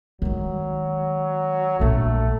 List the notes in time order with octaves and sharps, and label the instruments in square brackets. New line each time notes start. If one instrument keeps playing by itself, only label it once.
[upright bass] D#3 G#3 [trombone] F#3
[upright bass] A#1 C4 [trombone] A3